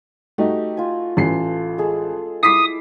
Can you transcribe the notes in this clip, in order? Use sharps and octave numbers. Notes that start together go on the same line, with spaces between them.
A3 D#4 F#4 G4 A#5
F4 G#5
A1 E3 A4 C7
G#3 G#4 A4
E4 D6 D#6 B6 C7